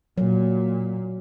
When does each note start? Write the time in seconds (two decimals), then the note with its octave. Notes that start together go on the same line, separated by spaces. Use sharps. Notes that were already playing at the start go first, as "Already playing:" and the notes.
0.18 A#2 F#3